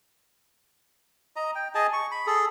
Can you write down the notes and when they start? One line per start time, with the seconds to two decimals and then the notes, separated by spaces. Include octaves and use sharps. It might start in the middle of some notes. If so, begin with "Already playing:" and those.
1.36 D#5 A#5
1.55 G5
1.75 G#4 D#5 G#5 A5
1.93 C#6
2.11 B5
2.27 G#4 A4